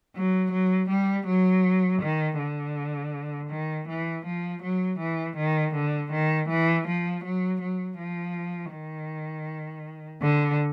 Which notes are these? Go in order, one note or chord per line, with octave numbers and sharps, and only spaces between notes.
F#3
F#3
G3
F#3
D#3
D3
D#3
E3
F3
F#3
E3
D#3
D3
D#3
E3
F3
F#3
F#3
F3
D#3
D3